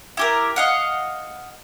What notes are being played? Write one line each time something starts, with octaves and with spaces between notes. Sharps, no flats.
E4 G4 A#4
D#5 F5 F#5